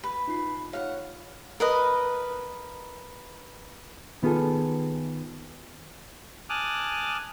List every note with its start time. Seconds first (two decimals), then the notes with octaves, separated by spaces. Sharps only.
0.04 B4
0.28 D#4 F4 C7
0.73 C#5 F5 F#5
1.60 A#4 B4 D#5
4.23 D#3 B3 F4 G#4 A4
6.50 G#5 A5 D6 D#6 F6 F#6